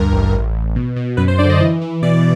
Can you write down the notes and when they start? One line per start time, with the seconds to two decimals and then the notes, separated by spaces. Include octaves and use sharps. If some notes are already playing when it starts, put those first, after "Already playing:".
Already playing: D2 G2 A#4
0.12 A1
0.32 A1
0.54 A1
0.76 B2
0.96 B2
1.17 F#2 B4
1.28 C5
1.38 D3 D5
1.50 D#5
1.61 E3
1.82 E3
2.02 B2 D5